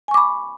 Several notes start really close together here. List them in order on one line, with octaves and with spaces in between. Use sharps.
G#5 C#6 D6 B5